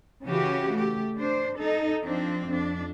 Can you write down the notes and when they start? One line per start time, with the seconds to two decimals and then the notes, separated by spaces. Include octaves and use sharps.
0.23 C#3 E3 C#4 F#4 G4
0.72 A3 G4
1.17 D4 C5
1.57 D#4 A4
2.02 F3 C4 D4
2.47 F2 D4